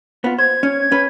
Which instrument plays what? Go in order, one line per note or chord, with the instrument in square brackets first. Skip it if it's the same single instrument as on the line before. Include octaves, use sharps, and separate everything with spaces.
[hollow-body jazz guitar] B3 F4
[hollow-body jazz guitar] C5 [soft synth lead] G#6
[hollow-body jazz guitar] C#4
C#4 B4